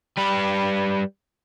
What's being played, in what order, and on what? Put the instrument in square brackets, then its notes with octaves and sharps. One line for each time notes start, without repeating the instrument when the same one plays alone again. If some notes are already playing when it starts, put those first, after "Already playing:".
[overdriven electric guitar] G3 B4